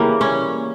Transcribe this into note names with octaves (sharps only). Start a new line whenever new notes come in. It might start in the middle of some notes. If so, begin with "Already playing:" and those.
Already playing: C#3 E3 G3 A#3
C#4